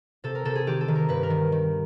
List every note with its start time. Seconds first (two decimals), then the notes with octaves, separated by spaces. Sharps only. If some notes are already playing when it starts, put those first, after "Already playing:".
0.24 C3 A4
0.35 A#4
0.45 C3 A4
0.55 G#4
0.67 D#3 G4
0.81 A4
0.88 D#3
0.95 A#4
1.09 G2 B4
1.23 A#4
1.30 D#3
1.52 D#3